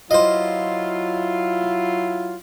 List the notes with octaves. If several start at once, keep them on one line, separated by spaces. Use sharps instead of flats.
F#3 E4 F4 C5 D#5